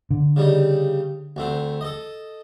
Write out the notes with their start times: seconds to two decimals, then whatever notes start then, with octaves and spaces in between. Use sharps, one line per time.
0.11 D3
0.36 C#3 G3 D#4
1.36 D2 A3 C4
1.81 A4 D#5